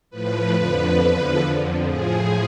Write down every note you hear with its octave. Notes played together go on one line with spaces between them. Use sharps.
A2 F3 B4
F2 D3 F3
E2 D3 F3
F2 D3 F3
A2 F3 G#4